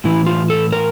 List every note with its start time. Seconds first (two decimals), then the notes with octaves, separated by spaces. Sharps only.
0.04 A2 E3 E4
0.26 F4
0.50 A4
0.72 A#4